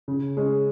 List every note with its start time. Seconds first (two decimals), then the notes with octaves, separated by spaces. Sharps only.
0.08 C#3
0.37 G#3 C#4